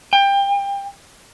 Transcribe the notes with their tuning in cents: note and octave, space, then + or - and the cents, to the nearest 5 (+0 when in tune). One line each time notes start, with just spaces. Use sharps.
G5 +25